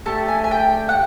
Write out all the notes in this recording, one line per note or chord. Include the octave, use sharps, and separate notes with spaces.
A3 D4 G4 A5
G#5
G#5
G5
F#5